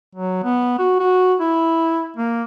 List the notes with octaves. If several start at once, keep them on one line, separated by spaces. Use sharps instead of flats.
F#3
B3
F#4
F#4
E4
A#3